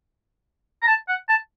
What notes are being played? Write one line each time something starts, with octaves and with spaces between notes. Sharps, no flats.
A#5
A5
F#5
A5